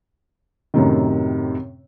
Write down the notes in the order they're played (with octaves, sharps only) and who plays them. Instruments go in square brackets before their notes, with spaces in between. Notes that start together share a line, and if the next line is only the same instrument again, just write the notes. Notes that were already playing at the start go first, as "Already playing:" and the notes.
[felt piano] F#2 A2 C3 D#3